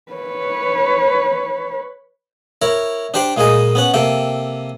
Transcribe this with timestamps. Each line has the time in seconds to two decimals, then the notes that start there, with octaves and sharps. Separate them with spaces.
0.12 B4 C#5
2.62 E4 A#4 C#5
3.14 D4 G4 C5 D5 G5
3.37 A#2 G#3 A#3 G#4 D#5
3.75 B3 C#4 F#5
3.94 C3 A#3 A4 G5